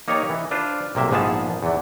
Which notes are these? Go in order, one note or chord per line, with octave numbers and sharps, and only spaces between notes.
A#3 D#4 G4 C#5 D5 A#5
E3
D4 F4 B4 C5
B1 C3 A#3 E5
A#1 G#2 F3 B3 G#4 A5
E2 E3